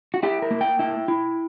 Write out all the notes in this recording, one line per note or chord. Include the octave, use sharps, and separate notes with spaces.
F#4
E4 G4
A#4
A#3
G5
E4 G5
E4